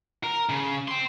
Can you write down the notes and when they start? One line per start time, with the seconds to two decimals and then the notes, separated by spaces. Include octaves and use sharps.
0.24 A#4
0.49 C#3
0.88 G5 C6